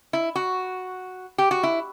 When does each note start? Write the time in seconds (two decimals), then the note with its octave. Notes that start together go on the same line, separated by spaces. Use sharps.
0.13 E4
0.35 F#4
1.38 G4
1.51 F#4
1.63 E4